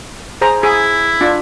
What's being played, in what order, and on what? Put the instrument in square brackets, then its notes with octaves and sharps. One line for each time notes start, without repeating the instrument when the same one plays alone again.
[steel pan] G#4 C5 A#5
[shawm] E4 [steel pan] G#4
[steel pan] D4 F4